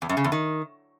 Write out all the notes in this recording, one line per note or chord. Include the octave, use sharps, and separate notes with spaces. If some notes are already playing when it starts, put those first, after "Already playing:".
E2
F#2
C#3
E2
D#3